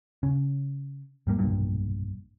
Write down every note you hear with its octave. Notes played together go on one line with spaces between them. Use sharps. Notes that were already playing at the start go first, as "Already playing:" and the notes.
C#3 C#4
G#2 G3 A#3
F1 B1 G2 A#2